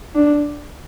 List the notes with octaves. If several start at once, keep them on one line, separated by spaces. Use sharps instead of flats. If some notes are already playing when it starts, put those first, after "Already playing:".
D4